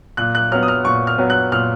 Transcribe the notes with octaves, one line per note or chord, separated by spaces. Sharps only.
A#2 F#6
F#6
F#3 B3 F6
D#6
F6
A#2 C#6
F6
F#3 B3
F#6
A#2 F6